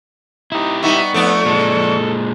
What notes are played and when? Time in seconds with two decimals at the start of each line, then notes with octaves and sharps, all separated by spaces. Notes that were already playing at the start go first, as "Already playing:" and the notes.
0.52 D#4 E4 G4
0.83 G3 B3 D#4 E5 C#6
1.14 F2 A3 B3 D4 D5
1.45 A#2 G#3 A4